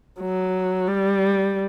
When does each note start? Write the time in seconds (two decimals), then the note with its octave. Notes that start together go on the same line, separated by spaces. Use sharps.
0.20 F#3
0.88 G3